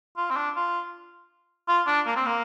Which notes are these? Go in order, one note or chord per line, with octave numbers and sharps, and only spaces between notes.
F4
C4
D4
F4
F4
D4
A#3
C4
A#3